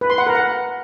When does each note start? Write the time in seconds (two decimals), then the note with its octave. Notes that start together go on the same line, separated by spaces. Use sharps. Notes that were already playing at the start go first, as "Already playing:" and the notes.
0.01 B4
0.10 C6
0.18 F#5
0.27 A#4
0.35 F#5